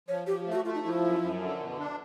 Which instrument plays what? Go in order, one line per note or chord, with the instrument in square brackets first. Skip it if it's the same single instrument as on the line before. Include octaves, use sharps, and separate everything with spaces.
[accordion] F3 [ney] C#5
[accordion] F3 [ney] G4
[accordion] A3
[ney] F4
F#4
[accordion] A3 [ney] F4
[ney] D#4
[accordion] F3 [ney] E4
[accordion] F#2
F#2
D3
B2
D4